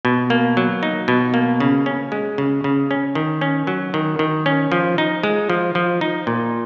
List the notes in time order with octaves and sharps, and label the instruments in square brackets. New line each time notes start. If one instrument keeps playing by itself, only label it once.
[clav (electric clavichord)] B2
A#3
F#3
D#4
B2
A#3
C#3
C#4
G#3
C#3
C#3
C#4
D#3
C#4
F#3
D#3
D#3
C#4
F3
D#4
G#3
F3
F3
D#4
A#2